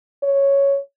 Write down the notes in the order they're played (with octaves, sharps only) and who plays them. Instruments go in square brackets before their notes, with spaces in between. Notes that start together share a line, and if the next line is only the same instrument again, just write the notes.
[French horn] C#5